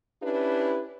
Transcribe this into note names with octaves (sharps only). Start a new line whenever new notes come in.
C#4 D4 E4 G4 B4